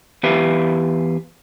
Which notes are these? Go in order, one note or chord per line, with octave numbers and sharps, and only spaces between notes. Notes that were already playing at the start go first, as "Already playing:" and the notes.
E2 G4 B4 E5 F5